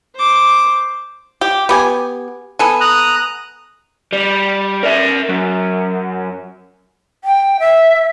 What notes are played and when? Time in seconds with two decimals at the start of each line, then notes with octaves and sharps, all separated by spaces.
0.16 C5 D6
1.41 G4
1.69 B3 G4 G#5
2.59 B3 A4 G#5
2.81 A#5 D#6 F#6
4.13 G3
4.83 A#4 E5
5.29 F#2
7.24 G5
7.60 E5